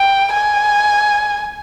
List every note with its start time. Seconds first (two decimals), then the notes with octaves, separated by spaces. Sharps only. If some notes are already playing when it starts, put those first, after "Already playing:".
Already playing: G5
0.33 G#5